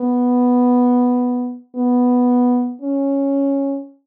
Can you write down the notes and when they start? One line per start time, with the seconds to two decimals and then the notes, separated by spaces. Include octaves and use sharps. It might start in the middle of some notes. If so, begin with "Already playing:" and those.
Already playing: B3
1.75 B3
2.81 C#4